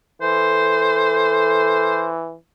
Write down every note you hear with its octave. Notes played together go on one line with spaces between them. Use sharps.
E3 A4 C5